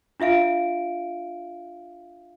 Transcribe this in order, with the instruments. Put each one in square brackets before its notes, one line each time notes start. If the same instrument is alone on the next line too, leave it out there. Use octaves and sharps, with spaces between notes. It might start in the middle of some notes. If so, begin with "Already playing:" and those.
[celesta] D4 F4 E5 F5 D7